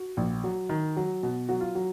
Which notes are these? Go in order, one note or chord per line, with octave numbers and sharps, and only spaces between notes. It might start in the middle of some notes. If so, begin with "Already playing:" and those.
Already playing: F#4
A#1
F#3
D#3
F#3
B2
F#3 F#4
F4
F#3